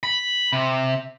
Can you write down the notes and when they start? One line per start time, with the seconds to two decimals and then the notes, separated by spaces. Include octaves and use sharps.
0.03 B5
0.52 C3